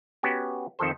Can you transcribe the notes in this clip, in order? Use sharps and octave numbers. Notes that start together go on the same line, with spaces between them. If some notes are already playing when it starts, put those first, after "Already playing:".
B3 C#4 F#4 G4
F2 D#3 F3 A4 C5